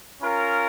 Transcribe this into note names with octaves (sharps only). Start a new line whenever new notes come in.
C#4 F4 A#4